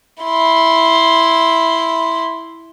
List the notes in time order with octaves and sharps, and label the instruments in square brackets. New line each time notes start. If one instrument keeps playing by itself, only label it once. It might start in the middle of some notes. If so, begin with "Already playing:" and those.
[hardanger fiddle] E4 C6